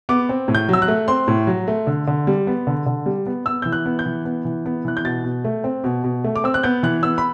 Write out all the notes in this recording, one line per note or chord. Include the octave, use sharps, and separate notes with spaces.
B3 D6
C4
A2
G6
F#3 E6
F#6
A3
C4 C6
A2
F#3
A3
D3
D3
G3
B3
D3
D3
G3
B3
B3 E6
E3 G6
F#6
B3
G6
E3
B3
E3
B3
E3 F#6
G6
B2 A6
B2
A3
C4
B2
B2
A3
D6
C4 E6
F#6
B3 G6
E3 F#6
B3 E6
B5